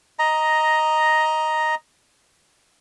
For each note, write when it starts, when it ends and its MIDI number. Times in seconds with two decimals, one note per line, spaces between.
0.19 1.75 75
0.19 1.75 82